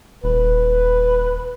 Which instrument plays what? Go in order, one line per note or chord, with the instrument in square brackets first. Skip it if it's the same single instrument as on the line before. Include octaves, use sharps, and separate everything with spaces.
[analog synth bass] D#1 [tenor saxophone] B4